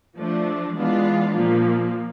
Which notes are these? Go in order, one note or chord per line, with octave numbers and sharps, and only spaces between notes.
F3 A3 D4
E3 G#3 B3 D4 F4
A#2 F3 A#3